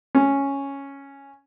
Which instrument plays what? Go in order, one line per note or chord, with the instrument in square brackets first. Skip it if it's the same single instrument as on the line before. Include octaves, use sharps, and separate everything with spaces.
[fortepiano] C#4